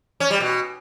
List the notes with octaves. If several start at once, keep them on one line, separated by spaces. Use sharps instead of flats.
C#4
G3
B2